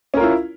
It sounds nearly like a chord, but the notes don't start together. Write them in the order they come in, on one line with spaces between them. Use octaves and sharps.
C#4 A#4 F4 E4